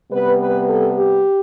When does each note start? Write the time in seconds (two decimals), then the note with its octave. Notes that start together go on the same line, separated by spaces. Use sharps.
0.11 C3 G3 B3 B4
0.41 B4
0.69 A4
0.97 G4